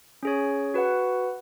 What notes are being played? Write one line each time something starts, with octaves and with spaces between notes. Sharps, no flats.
C#4 G#4 C#5
F#4 B4 F#5